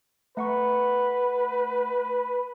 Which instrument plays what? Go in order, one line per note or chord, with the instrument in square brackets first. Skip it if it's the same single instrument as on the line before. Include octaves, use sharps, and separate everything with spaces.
[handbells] A3 F#5 C#6 [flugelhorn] B4